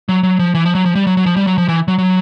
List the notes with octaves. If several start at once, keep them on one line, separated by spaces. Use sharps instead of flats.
F#3
F#3
F3
E3
F3
F#3
F3
G3
F#3
F#3
F3
G3
F#3
F3
E3
F#3
F#3